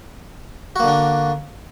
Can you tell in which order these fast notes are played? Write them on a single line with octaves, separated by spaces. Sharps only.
F#4 A#3 D3 D4